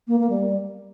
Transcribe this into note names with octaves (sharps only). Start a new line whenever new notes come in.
A#3
A#3
G3